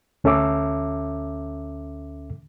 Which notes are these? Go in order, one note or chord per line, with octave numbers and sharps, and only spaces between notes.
D2 C#4 A4 E5 D6